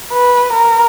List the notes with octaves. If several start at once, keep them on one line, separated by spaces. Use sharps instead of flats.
B4
A#4